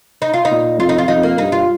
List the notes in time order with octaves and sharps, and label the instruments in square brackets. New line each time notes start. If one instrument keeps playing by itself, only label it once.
[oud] D#4
F4
D#4
[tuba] A#2
[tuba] F2 [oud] F4
[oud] D#4
F4
[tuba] F2 [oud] D#4
[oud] A#3
[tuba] G2 [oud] D#4
[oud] F4